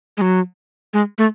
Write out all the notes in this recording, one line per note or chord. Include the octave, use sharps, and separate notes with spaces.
G#3
F#3
G#3
A3